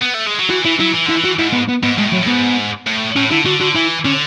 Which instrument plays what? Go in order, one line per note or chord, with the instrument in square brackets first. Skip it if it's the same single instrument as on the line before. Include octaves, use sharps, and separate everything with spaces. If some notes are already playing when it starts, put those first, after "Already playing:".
[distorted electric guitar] B3
A3
G#3
F#3
[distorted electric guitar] E3 [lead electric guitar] F#4
[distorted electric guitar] E3 [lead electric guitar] E4
[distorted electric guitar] F#3 [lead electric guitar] E4
[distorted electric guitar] E3
[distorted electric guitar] D3 [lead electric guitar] E4
[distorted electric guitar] E3
[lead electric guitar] F#4
[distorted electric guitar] G#2 [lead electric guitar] E4
[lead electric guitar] B3
B3
[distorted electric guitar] G#2 [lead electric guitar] B3
[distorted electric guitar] A2 [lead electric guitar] G#3
[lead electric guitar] F#3
[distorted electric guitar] A2
[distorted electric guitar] G#2 [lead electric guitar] B3
[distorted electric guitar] A2
[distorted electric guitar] A2 [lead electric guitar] C#4
[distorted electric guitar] D3 [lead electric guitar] E4
[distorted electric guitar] D3 [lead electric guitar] F#4
[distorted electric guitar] D3 [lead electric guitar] F#4
[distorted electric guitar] E3 [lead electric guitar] E4
[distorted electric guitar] D3 [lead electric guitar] C#4